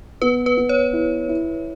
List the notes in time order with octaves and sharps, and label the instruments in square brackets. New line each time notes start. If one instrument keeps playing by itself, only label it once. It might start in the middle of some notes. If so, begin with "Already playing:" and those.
[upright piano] B3 [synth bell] B4
[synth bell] B4
[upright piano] B3
[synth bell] C#5
[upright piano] E4
E4